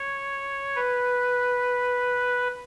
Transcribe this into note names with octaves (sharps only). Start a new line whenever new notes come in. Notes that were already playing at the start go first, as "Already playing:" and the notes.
Already playing: C#5
B4